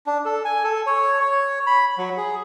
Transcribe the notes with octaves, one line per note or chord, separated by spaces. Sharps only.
D4
A4
G#5
A4
C#5
C#5
B5
F#3
G#4